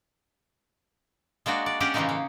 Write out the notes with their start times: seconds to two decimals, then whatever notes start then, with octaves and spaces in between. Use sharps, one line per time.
1.46 G#3 A#3 D4 F#4
1.66 D5
1.80 C#4 D4 G4 A#4 D5 F#5
1.94 A2 C#3 E3 G#3 A#3 D#4
2.09 A#3